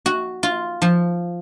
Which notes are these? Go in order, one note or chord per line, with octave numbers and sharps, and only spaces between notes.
F#4
F4
F3